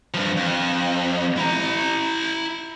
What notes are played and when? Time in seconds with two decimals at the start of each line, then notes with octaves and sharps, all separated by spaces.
0.14 G2 F3
0.37 F2
1.37 E4 A#5